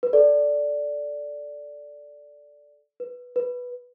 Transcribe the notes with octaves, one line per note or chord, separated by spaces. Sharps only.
B4
A4 D5
B4
B4